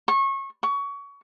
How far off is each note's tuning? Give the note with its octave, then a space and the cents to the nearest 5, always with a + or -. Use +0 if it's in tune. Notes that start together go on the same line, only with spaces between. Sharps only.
C#6 -25
C#6 +25